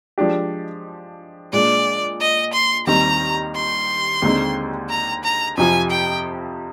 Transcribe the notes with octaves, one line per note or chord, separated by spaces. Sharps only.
F3 G#3 D4 G4
A#2 G#3 D4 D5
D#5
C6
D#2 D#3 G3 C4 A#5
C6
D#2 D3 G#3 C4 D#4
A#5
A#5
F2 C3 F3 G#5
G5